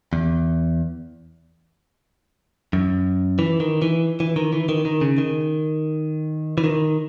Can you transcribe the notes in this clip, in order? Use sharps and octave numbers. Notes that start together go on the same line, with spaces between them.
E2
F#2
E3
D#3
E3
E3
D#3
E3
D#3
D#3
C#3
D#3
E3
D#3